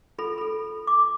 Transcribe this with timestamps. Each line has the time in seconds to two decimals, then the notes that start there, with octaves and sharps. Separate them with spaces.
0.18 F4 A4 B5
0.38 A4 B5
0.87 D6